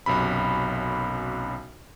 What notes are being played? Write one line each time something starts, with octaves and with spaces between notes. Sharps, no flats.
B1 F#2 C3 B5